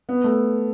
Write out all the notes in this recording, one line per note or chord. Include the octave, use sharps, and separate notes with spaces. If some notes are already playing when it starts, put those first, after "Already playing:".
B3
A3